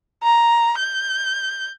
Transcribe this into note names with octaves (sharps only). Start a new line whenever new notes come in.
A#5
G6